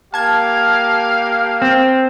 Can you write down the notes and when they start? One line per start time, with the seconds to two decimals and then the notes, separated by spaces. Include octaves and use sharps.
0.14 A#3 G4 F5 A5 G#6
1.62 C4